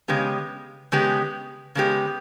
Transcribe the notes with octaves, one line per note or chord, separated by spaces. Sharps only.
C#3 G#3 B3 G4
C#3 G#3 B3 G4
C#3 G#3 B3 G4